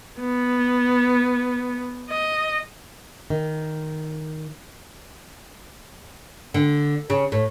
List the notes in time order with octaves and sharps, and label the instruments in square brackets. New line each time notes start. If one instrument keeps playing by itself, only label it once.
[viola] B3
D#5
[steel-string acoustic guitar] D#3
[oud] D3
C#3
A2